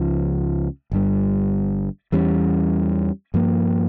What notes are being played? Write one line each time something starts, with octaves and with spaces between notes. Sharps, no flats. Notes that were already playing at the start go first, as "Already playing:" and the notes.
Already playing: C#2 C#3 F3
G1 G2 G3
E2 E3 G3 C#4
G2 F3 A#3